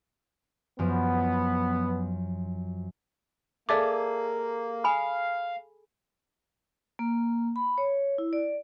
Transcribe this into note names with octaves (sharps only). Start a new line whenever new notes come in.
F#2 F3 B3
A#3 G#4 A4 D5 E5 A5 D6
F5 G#5 B5 D#6
A#3
B5
C#5
E4
D5